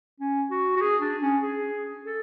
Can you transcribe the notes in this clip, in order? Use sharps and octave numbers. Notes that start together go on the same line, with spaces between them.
C#4
F#4
F#4
G#4
D4
C#4
G#4
A4